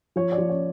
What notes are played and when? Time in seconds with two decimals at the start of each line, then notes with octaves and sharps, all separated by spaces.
0.16 F3 C#5
0.32 D5
0.38 F3
0.49 C#5